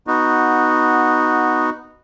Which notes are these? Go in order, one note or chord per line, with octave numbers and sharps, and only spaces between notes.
B3 D#4 F#4